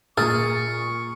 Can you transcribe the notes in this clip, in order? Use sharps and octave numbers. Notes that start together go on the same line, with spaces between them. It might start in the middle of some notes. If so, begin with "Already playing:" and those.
A#2 G#4 C#6 F6 A6